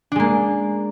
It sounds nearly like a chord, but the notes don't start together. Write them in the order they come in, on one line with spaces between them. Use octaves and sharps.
D4 G#3 A#3